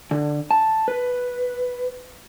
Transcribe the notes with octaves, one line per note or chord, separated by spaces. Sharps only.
D3
A5
B4